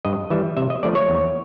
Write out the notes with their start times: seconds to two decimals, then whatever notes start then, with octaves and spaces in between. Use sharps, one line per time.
0.05 G2 D#5
0.30 E3 G3 E5
0.57 C3 E5
0.70 D#5
0.83 F3 A3 D4 D5
0.95 C#5
1.09 E2